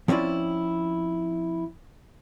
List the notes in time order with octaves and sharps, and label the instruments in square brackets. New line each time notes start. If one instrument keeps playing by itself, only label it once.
[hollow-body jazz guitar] F3 C4 C#4 E4 D5